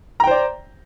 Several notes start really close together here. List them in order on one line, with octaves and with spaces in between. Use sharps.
A#5 G5 C5 D5